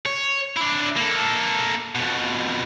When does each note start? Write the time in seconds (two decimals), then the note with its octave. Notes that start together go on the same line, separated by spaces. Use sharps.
0.06 C#5
0.57 D4 E4
0.96 A#3 A4
1.95 F2 B2